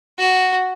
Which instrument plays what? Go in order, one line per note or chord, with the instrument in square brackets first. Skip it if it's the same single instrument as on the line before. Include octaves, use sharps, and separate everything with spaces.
[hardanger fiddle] F#4